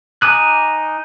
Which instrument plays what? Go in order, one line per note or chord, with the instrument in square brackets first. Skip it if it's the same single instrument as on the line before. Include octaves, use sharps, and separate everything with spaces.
[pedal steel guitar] D#4 G#5 D6 D#6 F#6